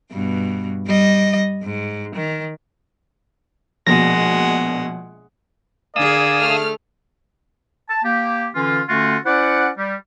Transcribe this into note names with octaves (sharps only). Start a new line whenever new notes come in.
G2 B2
G3 D#5
G#2
D#3
A#1 B2 F3 G#3 F#5 A#6
D3 G#4 A#4 D5 F5 G#5 D#6 E6
A3 F6
A5
A#3 G4
D3 E3 C#4 F4
D3 A3 C#4 F4 F#4
C#4 E4 C5 D5 F#5
G3